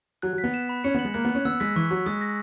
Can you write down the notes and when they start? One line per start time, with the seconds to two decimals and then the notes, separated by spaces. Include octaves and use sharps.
0.22 F#3 F#6
0.33 F#3
0.38 B6
0.44 B3
0.54 E7
0.69 B5
0.84 C#4 C#7
0.95 B3
0.99 F#7
1.05 G#3
1.14 A#3 F#6
1.25 B3
1.29 F#6
1.35 C#4
1.45 B3 E6
1.60 G#3 B6
1.76 E3 C#6
1.90 F#3 C#6
2.06 G#3 D#6
2.21 A#6